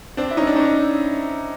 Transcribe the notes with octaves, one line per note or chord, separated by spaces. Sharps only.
C4 D4
E4
C#4 D#4
D4
C#4 D#4